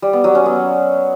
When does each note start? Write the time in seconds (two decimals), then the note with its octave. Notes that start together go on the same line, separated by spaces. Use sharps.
0.02 G3
0.13 B3
0.24 F#3
0.35 C#4
0.46 B3